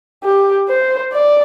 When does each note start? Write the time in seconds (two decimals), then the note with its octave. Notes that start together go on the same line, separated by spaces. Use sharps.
0.24 G4
0.69 C5
1.13 D5